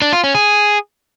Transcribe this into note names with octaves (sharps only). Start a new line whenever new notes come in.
D4
F4
C#4
G#4